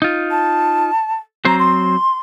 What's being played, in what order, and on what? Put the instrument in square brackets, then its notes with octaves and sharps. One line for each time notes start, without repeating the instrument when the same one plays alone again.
[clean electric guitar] D#4 F4
[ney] A5
[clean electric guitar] F#3 C4 C5 [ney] A#5
[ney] C6